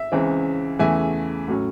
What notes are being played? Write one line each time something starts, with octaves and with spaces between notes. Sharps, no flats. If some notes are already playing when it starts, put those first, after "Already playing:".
Already playing: E5
C#2 C#3 E3 C4
E2 C#3 E3 A3 E5 G#5
A2 F#3 C#4